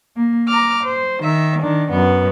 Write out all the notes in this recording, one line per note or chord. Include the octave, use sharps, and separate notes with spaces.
A#3
A#5 D6 F6
C5
D#3 E5
D#3 D4
F#2 B3